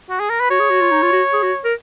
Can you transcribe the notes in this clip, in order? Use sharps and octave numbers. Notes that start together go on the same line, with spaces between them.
F#4
G#4
A#4
B4
F#4 C#5
G#4
F#4
F4
D#4
F4
F#4
G#4
F#4
A#4